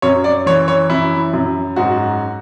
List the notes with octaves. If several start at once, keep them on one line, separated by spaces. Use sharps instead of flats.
F#2 C#5
D5
E3 C#5
C#5
F#2 E4
F#2
G#2 F#4